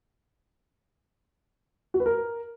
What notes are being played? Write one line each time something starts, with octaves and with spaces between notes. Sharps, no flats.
F#4
B4
A#4